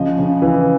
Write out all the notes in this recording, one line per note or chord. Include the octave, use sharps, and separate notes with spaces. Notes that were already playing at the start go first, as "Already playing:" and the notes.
Already playing: C#3 F3 D#5
C#3
E3